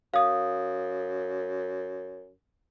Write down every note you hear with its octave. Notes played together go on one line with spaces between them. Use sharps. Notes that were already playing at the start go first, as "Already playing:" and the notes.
F#2 F5 D#6